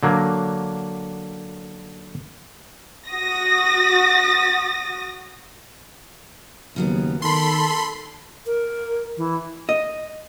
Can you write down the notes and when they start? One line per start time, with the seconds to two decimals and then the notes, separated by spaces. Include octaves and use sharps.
0.03 D3 F#3 A#3
3.10 F#4 D#6 A#6
6.76 D#2 C#3 F#3 B3
7.22 D#3 A4 A#4 B5 C6
8.46 A#4
9.17 E3
9.69 D#5